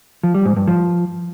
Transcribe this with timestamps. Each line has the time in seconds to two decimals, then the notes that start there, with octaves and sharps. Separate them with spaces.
0.23 F3
0.35 G3
0.46 G#2
0.57 G2
0.68 F3